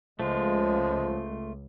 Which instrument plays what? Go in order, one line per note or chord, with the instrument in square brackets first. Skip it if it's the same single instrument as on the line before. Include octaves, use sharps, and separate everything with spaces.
[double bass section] C#2 [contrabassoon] F3 [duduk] G#3 [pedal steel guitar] A3 F4